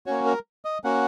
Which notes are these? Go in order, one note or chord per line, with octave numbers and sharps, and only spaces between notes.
A#3 C#4 F#4 C#5
A#4
D#5
A#3 C#4 F#4 F#5